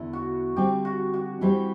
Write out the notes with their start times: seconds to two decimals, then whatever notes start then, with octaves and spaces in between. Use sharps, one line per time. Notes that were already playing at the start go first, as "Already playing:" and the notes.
Already playing: E2 D3 E4
0.13 F#4
0.56 D3 G3 C4 G4
0.85 F#4
1.14 F#4
1.41 E3 G3 C4 G4 C5